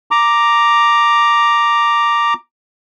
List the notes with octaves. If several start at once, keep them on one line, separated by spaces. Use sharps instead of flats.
A#5 D6